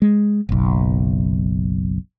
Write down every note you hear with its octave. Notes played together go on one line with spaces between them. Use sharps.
G#3
F#1 B1